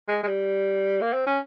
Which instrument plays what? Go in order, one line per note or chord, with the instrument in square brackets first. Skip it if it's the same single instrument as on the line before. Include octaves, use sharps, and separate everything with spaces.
[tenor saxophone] G#3
G#3
G3
A#3
C4
C#4